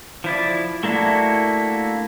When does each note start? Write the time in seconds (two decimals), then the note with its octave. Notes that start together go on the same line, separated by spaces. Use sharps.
0.24 F3 E4 D5
0.83 A3 A#3 D4 E4 F#4